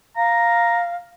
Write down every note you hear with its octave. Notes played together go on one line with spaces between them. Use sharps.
F5 A#5